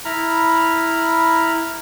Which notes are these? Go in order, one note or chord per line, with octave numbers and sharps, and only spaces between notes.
E4 A#5 B5 F6